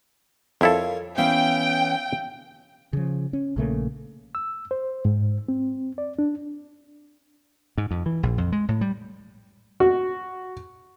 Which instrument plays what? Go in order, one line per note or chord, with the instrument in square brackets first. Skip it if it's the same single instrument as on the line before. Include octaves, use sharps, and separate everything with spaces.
[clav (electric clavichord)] F2 E4 A4 [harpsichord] A#3 C#5 F5
[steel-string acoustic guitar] E3 B3 C#4 [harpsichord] E5 F5 [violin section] G5
[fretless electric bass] C#3 F3
C#4
A#1 C#3 A3 A#3
[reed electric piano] E6
C5
G#2
C4
D5
D4
[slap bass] G#2
F2
E3
A#1
F2
G#3
A2
G3
[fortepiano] F#4